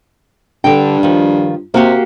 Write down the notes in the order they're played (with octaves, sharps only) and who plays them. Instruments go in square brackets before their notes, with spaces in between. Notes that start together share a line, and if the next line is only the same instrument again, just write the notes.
[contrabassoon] G2 [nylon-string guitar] D3 G5
[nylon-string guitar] D#3 F3
[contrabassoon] C3 [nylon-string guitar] A#3 F#4 G4